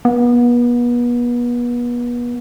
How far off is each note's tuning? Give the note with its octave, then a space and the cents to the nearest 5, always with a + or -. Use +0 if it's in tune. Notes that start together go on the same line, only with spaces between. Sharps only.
B3 -35